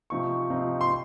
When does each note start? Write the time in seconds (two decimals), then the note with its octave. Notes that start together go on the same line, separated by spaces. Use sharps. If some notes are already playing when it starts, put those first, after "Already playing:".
0.10 C3 F3 C4 D#4 C#6
0.50 C3 F3 C4 D#4
0.81 C6